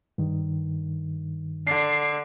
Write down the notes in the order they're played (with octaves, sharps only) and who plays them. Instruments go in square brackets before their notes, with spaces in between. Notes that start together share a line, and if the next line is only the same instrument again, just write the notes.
[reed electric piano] G2 D#3
[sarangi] D3 [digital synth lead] C7